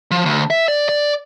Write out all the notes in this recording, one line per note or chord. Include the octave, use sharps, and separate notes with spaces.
F3
D2
E5
D5
D5